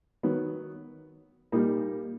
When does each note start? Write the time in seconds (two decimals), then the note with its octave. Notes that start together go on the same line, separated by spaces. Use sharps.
0.23 D#3 F#3 B3
1.52 A#2 G3 A#3 D#4